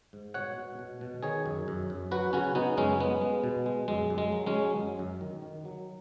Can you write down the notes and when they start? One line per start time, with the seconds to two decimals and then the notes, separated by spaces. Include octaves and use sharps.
0.13 G#2
0.34 B2 C#5 F#5
0.57 B2
0.79 B2
1.01 B2
1.23 D#3 G#4 C#5
1.46 F#2
1.68 F#2
1.90 F#2
2.11 F#3 F#4 B4
2.33 C#3 C#4 F#4
2.55 C#3 B3 D#4
2.77 F#2 G#3 C#4
2.99 G#3 B3
3.21 G#3
3.44 B2
3.66 G#3
3.88 F#2 G#3
4.10 F#2
4.18 G#3
4.32 F#3
4.46 G#3 C#4
4.54 F#3
4.76 F#2
4.99 F#2
5.21 D#3
5.42 D#3
5.65 F#3